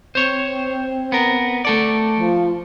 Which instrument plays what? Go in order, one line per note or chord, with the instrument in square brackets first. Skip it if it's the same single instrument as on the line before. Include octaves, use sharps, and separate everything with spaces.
[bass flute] C4 [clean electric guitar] C5 C#5
[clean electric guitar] B3 A#4
A3 A4 D5
[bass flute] F3